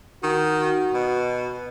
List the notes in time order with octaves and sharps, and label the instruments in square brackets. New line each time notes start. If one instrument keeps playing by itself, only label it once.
[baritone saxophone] D#3 [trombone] F#4
[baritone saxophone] B2